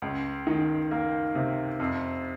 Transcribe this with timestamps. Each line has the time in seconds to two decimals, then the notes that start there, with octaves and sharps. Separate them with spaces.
0.02 C#2
0.47 D#3
0.91 A#3
1.35 C3
1.80 F2